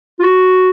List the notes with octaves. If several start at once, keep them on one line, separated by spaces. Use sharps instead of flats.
F4
F#4